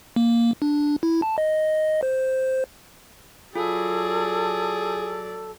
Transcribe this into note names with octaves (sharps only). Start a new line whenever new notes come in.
A#3
D4
E4
A5
D#5
C5
F#3 F4 G#4 A4 D5